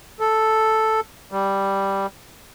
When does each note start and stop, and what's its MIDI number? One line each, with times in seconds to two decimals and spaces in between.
0.20 1.00 69
1.31 2.07 55